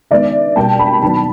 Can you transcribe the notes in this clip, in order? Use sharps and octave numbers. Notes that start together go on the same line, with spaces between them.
D#3 G#3 B3 D5 E5
B2 G3 A#3 G5 A5
A5 B5
D#3 F#3 B3 A5 B5